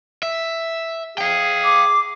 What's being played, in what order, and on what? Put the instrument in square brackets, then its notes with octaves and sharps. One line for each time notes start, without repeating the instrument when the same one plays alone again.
[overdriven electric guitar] E5
[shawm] G#4 [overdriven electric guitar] F5 G5
[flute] D6